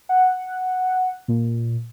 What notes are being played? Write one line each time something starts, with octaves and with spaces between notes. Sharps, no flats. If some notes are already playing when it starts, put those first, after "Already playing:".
F#5
A#2